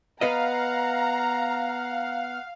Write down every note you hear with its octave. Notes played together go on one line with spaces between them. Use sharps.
B3 B4 D#5 F5 F#5 A#5